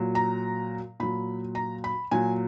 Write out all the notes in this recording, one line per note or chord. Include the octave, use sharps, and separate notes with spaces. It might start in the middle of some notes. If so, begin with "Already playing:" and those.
Already playing: A#2 F#3
A#5
A#2 F#3 B5
A#5
B5
A#2 F#3 G#5